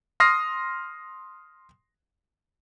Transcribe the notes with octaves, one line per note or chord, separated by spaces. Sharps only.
C6 D#6 F6 A#6 C7